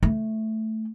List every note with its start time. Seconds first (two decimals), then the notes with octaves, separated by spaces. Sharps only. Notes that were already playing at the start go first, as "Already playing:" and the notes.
0.03 A3